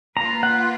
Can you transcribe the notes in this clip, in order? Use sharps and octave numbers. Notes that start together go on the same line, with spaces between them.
A#3 F4 B4 A#5
F#5